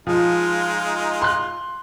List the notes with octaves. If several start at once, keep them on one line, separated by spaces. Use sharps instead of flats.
F3 G#3 D#4 F4
C6 F#6